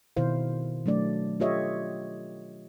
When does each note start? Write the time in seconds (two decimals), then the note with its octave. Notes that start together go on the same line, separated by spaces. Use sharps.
0.16 B2 D#3 E4 C5 F5
0.86 F#3 A3 D4 D5
1.40 F4 G4 A4 C#5 D#5 E5